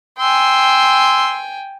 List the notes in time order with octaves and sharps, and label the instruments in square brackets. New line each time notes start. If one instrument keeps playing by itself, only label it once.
[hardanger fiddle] G5 G#5 [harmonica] C6 E6